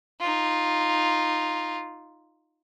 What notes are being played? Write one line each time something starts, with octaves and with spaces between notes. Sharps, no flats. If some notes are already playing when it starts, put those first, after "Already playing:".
D#4 F4